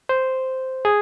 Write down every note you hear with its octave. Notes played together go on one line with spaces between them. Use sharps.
C5
G#4